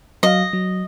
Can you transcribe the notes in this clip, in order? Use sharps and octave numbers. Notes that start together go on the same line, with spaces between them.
F#3 D#5 F5
F#3